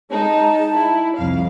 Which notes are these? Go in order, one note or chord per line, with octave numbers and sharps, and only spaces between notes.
G#3 D#4 A5
E4
C2 F2 F5